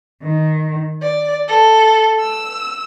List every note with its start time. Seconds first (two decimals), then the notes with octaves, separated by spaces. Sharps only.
0.23 D#3
1.01 D5
1.47 A4
2.19 E6